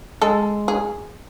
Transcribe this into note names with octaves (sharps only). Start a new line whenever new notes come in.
G#3 A4
G#4